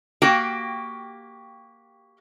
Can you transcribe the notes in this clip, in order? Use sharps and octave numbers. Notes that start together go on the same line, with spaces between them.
A#3 F#4 G4 F5 G5